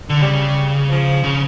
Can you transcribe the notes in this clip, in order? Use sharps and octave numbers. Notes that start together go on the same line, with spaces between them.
D3
C#3 G3
F3
C#3